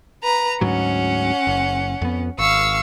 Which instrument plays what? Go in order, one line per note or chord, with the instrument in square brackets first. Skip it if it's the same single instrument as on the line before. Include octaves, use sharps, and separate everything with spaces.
[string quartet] B4 A#5
[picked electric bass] D2 G#2 F#3 [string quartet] C#4 F#5
[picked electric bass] F#1
F2 B3
[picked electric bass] G#1 [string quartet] F5 C#6 E6